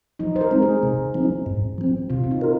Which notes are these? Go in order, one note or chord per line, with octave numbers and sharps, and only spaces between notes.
F3 D#4
C5
A#4
G#3 C4 D#4
G#4
C3
F3 C4 D#4
G#2
F3 C4
C3 F4
C4
D#4
F4 A#4